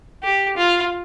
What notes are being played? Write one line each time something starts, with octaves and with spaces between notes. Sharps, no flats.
G4
F4